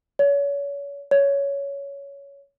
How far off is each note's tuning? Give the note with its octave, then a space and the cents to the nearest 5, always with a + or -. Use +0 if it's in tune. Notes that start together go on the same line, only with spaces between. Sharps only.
C#5 +35
C#5 +15